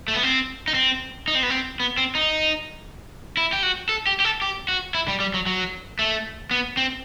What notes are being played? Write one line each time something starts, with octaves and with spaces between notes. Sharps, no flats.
A3
B3
C4
D#4
C4
D#4
C4
B3
C4
B3
C4
D#4
E4
G4
F#4
A4
G4
G4
A4
G4
F#4
E4
G3
G3
F#3
F#3
A3
B3
C4